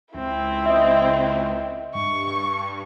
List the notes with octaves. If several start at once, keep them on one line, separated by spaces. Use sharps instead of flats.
C#2 C4 E4
D#5 E5
G2 C#6